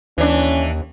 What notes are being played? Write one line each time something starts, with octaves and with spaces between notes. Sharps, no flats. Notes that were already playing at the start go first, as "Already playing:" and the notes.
D#2 E3 C#4 D4